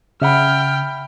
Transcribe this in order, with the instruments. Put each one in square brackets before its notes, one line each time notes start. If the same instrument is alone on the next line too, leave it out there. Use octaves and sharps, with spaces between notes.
[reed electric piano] C#3 [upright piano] E5 F#5 B5 [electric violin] G5 F6